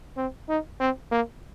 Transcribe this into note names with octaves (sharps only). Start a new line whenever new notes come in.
C4
D#4
C4
A#3